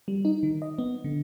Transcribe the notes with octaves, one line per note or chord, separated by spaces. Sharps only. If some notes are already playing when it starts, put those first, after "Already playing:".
G3
D#4
D#3
D#5
B3
D3